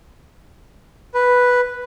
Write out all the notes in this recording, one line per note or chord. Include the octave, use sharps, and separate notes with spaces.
B4